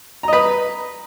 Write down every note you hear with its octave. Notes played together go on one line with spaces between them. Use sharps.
B4 D#5 A#5